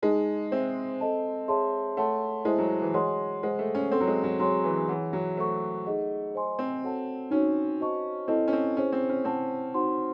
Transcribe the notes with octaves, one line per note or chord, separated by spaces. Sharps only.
G#3 D#4 G#4 D#5 A5
C4 G#4 C5 E5 G#5
A4 D#5 A5
G#4 C#5 E5 A5 C6
A3 C#5 F#5 A5 C6
G#3 E4 C5 E5 A5
F#3
E3
G#3 F#4 C#5 F#5 C6
G#3 G#4 C5 F#5
A3
C#4
C4 A4 C#5 F#5 C6
F#3
G#3
F#3
F#3 G#4 C#5 G#5 C6
E3
E3 G#4 C#5 F#5
F#3
A3 C5 F#5 C#6
D#4 G#4 D#5 F#5
C5 D#5 G#5 C6
C4
F#4 A4 C#5 F#5 A5
C#4 D#4 F#4 C#5
F#4 C5 D#5 A5 C#6
C4 E4 A4 D#5 A5
C#4
C4
C#4 E4 G#4 C5
C4
C#4
C4 E4 C5 F#5 A5
D#4 F#4 C5 F#5 C6